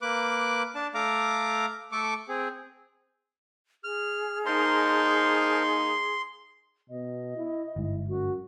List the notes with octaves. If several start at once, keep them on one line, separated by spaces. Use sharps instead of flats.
A#3 B4 D6 F#6
D4 A5
A3 F5 A#5 D6
A3 A4 C#6 D6
C4 G#4
G#4 F6
A#3 D#4 A#4 C5 A5 C6
B2 D#5
E4
G1 G#2 E4
F#2 F#4